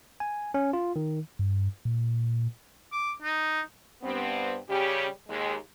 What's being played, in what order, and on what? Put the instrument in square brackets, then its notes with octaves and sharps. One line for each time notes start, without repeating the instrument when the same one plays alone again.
[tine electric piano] G#5
C#4
F4
D#3
[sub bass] G2
A#2
[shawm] D6
D#4
[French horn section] G2 B3 C4
C#3 G3 C#4 G4
D#2 G#3